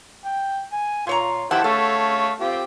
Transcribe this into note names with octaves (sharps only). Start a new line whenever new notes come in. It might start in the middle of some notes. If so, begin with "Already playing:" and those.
G5
G#5
A#2 F4 C#5 A#5
F2 E4 G4 C5 F#5 A5
A3 A4 C#5 F5
C4 F4 G4